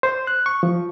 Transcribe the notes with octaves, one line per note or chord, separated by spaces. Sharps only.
C5
F#6
C#6
F3